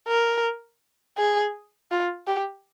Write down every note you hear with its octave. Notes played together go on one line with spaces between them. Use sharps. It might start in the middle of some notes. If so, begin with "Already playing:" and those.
A#4
G#4
F4
G4